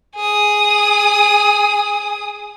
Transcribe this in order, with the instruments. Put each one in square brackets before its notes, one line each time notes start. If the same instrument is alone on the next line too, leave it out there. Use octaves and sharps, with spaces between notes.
[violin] G#4 D#6